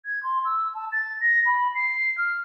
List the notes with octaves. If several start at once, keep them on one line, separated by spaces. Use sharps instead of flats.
G#6
C6
E6
A5
A6
A#6
B5
C7
F6